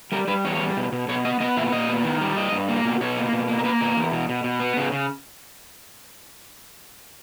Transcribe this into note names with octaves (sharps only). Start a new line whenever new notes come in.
G3 A#4
G3 B4
E2 C#5
G3
B2
B2
B2 C#5
B3 D#5
B3 D#5
A#2 E5
A#2 D#5
B3
D#3
G3
G2 D#5
G2
A#3
B2
B2 C#5
A#3
B2
A#3
A#4
A#3 B4
B2 A#4
E2
B2
B2
B2
B3
C#3
C#3